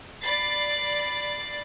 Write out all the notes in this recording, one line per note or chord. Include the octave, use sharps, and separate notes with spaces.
D5 B5 A6 C7